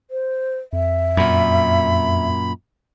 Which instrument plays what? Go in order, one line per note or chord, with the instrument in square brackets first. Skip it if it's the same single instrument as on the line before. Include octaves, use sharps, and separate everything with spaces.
[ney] C5
[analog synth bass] F2 [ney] E5
[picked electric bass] F#2 A#2 [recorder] B5